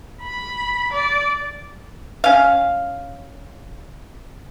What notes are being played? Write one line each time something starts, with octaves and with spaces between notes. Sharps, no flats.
B5
D5
C#4 F5